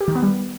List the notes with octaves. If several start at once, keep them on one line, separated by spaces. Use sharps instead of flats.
G4
D#3
B3
G3